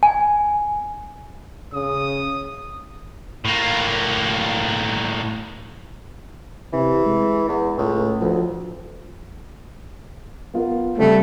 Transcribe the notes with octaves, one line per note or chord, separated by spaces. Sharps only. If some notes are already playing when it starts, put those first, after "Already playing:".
G#5
C#3 D#6
A2 A#3
C3 E3
G#3
E2
C#2 A2
D2 F3
B3 F4 A#4
C#3 G3 A3 C4